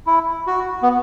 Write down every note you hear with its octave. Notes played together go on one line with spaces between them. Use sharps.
E4
F#4
B3